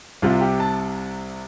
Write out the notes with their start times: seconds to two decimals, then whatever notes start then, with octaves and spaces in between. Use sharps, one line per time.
0.22 C2 C3 F4
0.41 G4
0.60 A5